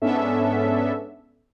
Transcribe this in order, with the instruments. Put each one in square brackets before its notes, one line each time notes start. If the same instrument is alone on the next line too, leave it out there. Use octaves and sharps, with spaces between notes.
[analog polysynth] G#2 B3 C#4 D4 A4 E5